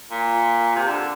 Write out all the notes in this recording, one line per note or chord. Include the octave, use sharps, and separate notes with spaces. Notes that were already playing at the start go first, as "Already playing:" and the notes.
A#2
C3
D3